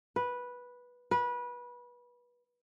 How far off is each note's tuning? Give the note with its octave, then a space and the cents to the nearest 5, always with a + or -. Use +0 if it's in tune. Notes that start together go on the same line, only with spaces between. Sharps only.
B4 -10
B4 -25